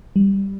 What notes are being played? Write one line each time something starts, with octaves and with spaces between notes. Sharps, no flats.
G3